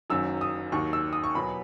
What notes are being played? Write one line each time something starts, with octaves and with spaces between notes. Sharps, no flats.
F#1 F#2 D#3 F#3 E6
D#6
D#2 D#3 F#3 C#6
E6
D#6
C#6
E2 B2 F#3 B5